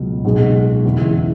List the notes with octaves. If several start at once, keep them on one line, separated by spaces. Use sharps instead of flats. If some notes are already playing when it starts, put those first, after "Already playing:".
Already playing: C#2 B2 F#3
B1 B2 G#3
F#1 E2 C#3 E3